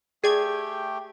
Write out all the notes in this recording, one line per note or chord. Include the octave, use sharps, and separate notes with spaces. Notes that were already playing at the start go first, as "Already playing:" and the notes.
A3 G4 G#4 D5 G5 G#6